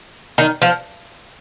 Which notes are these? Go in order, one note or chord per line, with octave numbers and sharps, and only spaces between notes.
D#3
F3